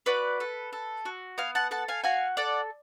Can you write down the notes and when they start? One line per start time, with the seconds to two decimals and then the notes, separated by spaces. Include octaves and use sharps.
0.06 F#4 B4 D5
0.40 A4
0.73 A4
1.05 F#4
1.38 B3 F5 G#5
1.55 F#5 A5
1.71 A4 F#5 A5
1.88 F5 G#5
2.04 F#4 F5 G#5
2.37 A4 D5 F#5